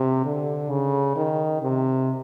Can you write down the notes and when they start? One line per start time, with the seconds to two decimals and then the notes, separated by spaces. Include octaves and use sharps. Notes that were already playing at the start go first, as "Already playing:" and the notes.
Already playing: C3
0.25 D3
0.70 C#3
1.16 D#3
1.62 C3